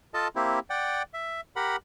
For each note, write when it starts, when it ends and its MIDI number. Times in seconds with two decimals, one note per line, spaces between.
0.14 0.28 65
0.14 0.28 69
0.14 0.28 75
0.14 0.28 81
0.36 0.59 58
0.36 0.59 60
0.36 0.59 64
0.36 0.59 67
0.70 1.02 74
0.70 1.02 78
0.70 1.02 79
1.14 1.41 76
1.56 1.76 67
1.56 1.76 70
1.56 1.76 78
1.56 1.76 83